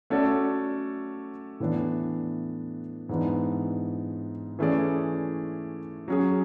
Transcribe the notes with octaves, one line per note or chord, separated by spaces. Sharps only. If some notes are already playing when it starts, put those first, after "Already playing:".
A3 C#4 F#4 A4 D5
A2 E3 B3 D4
G#2 E3 B3 D4
E3 A3 C#4 G#4 D5
F#3 C#4 G#4